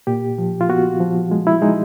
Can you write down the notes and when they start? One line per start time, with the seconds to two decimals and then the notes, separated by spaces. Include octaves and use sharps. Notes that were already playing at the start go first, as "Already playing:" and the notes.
0.07 A#2 G4
0.38 F3
0.61 F4
0.69 B3 F#4
1.00 F3
1.31 G#3
1.47 E4
1.62 G#3 D#4